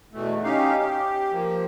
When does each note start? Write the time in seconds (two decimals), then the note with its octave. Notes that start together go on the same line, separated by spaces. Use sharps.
0.13 E2 B2 E3 A3
0.44 C#4 D#4 G4 F5
0.79 G4
1.32 F3 A#3